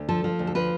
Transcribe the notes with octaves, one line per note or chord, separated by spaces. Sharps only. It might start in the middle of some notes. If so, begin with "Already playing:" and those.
Already playing: D2
F3 A4
F3
D2
A4
F3 B4